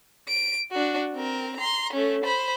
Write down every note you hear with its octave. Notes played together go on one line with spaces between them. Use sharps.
D7
D4 F#4
C4 A#4
A#5 C6
A3 C#4
C5 B5